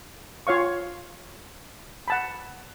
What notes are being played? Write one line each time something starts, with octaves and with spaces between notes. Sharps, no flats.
F4 C#5 F5 C#6
F#5 A5 B5